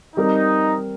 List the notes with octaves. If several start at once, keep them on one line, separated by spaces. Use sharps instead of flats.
G3 C4 D#4 G4 A#4